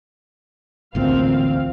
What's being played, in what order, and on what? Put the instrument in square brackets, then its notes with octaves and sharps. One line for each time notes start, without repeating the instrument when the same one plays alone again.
[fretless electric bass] A1 D2 A#2 [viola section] C4 F5